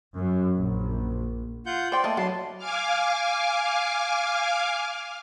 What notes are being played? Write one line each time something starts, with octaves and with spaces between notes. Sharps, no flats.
F#2
A#1
F4 F#5 G6
C5 D5 G5
A3 A#3 D#5 E5 A5
D3 E3 F#3 B3 C#5 A5 C6
F5 G#5 D6 F6